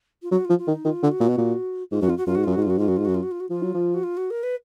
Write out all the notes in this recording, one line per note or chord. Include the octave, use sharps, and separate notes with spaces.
F4
F#3 F#4
F4
F3
F4
D#3
D#4
D#3 F4
D3
F#4
A#2
B2
A#2
G#2 F4
F#2 F#4
F2 F4
F#4
F#2 F4
G#2 F#4
F#2 F4
F#4
G#2
F4
F#2 F#4
G#2 F4
F#2 F#4
G#2 F4
F#2 F#4
F4
F#4
F4
F#4
F3 F4
F#3
F3
F#4
F4
F#4
A#4
B4